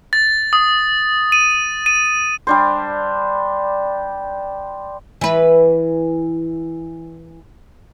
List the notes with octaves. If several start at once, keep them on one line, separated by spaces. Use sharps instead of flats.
A6
D#6
D#7
D#7
G3 D4 C5
E3 B4